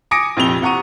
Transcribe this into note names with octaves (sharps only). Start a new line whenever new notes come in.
G#5 D6 D#6 A#6 C#7 D7
A#1 F2 C3 F7 G7
C3 F#5 A#5 C#6 D#7